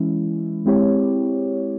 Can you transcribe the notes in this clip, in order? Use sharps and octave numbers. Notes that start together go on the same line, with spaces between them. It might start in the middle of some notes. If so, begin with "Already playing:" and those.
Already playing: E3 G#3 C#4 E4
G#3 C4 E4 G4 C#5